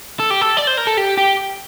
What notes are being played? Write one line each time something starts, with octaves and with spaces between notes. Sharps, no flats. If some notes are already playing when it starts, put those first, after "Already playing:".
A4
G4
A4
D5
C5
A#4
A4
G4
G4